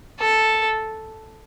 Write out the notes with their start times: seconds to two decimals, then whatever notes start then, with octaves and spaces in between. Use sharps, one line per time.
0.20 A4